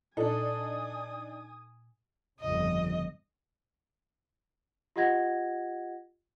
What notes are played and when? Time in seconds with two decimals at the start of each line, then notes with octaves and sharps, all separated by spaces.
0.17 A#2 D4 D#4 A4 G#5 D#6
2.40 G1 F2 C#3 D#5
4.96 F4 G4 D#5 F#5 G#6 A#6